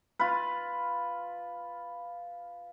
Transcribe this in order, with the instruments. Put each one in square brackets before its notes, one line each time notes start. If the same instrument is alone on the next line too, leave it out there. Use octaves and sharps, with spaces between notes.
[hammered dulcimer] F4 B4